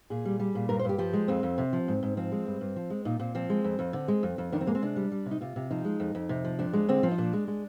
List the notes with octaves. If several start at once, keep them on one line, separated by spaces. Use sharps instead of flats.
A#2 G#4
G3
G3
A#2
G2 A#4
C5
G2 G4
F3 G4
G#3
F2 C4
F2
C3
F3
G#2
G#2
F3 C4
G#3
G2
G2
F3
G#3
A#2 D#4
A#2 C4
F3 C4
G#3
F2
F2
D3
G#3
F2
F2
D#3 D4
C4
G#3 A#3
C4
C3 D4
G3
G3
C3
D#4
C3 F4
C3
F3 D#4
G#3
F2
F2
C3
F3
F2 D4
G#3
D3 C4
F3
D#4
A#2 D4
G#3
G#3